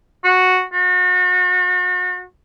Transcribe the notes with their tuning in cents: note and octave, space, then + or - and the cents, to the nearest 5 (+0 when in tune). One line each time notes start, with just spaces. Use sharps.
F#4 -5
F#4 -35